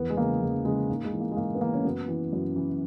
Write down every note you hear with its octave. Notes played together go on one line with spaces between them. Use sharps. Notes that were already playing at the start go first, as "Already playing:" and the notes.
Already playing: E2 B3
G#3
C#3 E3 A#3
E2 G#3
C#3 E3 G#3
G#2 A#3
G#3
E3
A#3
G#3
G#2 A#3
B3
E3 A#3
C#4
F#2 B3
E3
F#2
E3